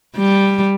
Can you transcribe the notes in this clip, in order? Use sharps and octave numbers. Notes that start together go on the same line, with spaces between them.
G3